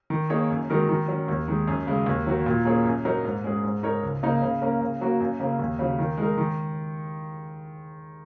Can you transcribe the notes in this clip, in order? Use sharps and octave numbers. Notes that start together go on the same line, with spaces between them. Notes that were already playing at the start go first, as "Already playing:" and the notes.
D#3
A#3 D#4 G#4 C#5
F#2
D#3 G#3 F#4 A#4
D#3
F#3 C#4
D#2
D#3 G#3
F#2
C#3 G#3
D#2
D#3 F#3 A#3 F#4
A#2
A#3 C#4 G#4 C#5
F#2
F#3 D#4 A#4
G#2
G#3 C#4 G#4
G#2
G#3 D#4 A#4 C#5
C#2
C#3 A#3 D#4
C#3
A#3 C#4 A#4
C#3
F#3 A#3 F#4
F#2
C#3 A#3 C#4
D#2
C#3 F#3
D#3
G#3 D#4 A#4
D#3